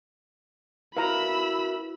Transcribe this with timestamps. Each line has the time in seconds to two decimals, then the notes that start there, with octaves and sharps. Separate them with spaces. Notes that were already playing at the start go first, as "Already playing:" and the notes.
0.97 E4 F#4 A#4 B4 F5 A#5 B5 E6